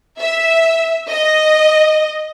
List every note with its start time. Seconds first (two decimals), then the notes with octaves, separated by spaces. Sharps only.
0.20 E5
1.09 D#5